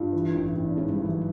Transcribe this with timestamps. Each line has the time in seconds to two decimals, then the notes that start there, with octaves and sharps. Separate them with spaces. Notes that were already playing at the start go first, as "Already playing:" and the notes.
Already playing: G2 F4
0.13 E3
0.35 A1
0.56 A1
0.69 D4
0.77 G#2 C#4
0.93 G3
0.99 E3
1.09 F#3